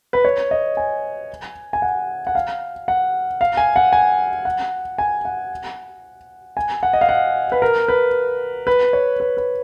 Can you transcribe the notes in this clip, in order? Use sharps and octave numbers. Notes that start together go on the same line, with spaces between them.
B4
C#5
D#5
G#5
G#5
F#5
F#5
F5
F#5
F5
G#5
F#5
G#5
F#5
G#5
F#5
G#5
F#5
D#5
F5
F#5
B4
A#4
B4
B4
C#5
B4
B4